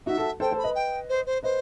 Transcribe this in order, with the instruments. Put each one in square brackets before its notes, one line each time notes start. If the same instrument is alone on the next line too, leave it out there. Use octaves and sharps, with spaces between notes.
[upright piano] D#4 F#4 [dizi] E5
[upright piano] F#4 A4
[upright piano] A4 C5 [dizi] G5
[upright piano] A4 C5
[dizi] B5
[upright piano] B4 D#5
[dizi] G5
C5
C5
[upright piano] B4 D#5 [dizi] C5